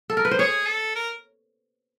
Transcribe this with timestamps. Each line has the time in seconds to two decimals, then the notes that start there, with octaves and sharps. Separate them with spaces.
0.10 A4
0.17 A#4
0.25 B4
0.31 C5
0.38 G#4 C#5
0.67 A4
0.95 A#4